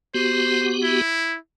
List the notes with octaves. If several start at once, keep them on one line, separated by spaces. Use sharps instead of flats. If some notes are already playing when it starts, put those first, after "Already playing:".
B3 F#4 G4 C5
E4